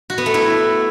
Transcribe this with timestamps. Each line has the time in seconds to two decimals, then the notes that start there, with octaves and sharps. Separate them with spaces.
0.10 F#4
0.18 B3
0.26 A3
0.34 E4